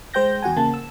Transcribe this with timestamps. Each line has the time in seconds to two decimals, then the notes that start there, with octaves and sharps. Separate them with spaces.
0.14 G#3 C5 G5 G6 A#6
0.42 E2 F#4 F#5 G#5
0.56 C#3 A#3 A5
0.74 E6